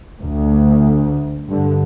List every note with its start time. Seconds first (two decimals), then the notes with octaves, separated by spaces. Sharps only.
0.21 D2
1.47 G2 D3